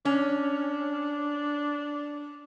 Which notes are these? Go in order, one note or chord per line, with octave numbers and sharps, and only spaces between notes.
C#4 D4